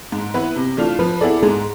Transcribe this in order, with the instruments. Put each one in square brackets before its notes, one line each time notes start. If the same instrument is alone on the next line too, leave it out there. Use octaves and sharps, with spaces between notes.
[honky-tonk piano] G#2
E3 B3 E4 B4
C3
E3 A3 D4 F4
[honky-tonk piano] F3 [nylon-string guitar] B4
[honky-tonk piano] B3 E4 G#4 D5 [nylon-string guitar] A4
[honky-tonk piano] G#2 [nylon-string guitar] G#4